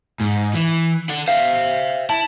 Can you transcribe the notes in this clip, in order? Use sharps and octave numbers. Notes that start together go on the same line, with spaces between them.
G#2
E3
D4 F#5
C5 E5 F5
E4 A5